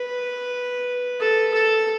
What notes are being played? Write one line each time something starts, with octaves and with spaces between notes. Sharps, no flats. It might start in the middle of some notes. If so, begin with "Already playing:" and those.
Already playing: B4
A4
A4